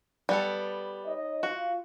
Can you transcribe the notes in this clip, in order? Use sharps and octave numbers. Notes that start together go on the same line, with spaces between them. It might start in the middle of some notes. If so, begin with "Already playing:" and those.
G3 B3 A4
D#4 C#5 D#5
F4 F#4